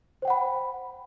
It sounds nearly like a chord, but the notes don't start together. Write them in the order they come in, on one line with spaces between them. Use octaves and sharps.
C5 G5 F#5 B5